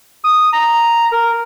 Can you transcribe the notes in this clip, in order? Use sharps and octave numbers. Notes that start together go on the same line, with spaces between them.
D#6
A#5
A#4